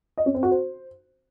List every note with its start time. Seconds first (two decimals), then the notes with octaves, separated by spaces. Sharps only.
0.18 D#5
0.26 C#4
0.34 C4
0.43 F#4
0.51 C5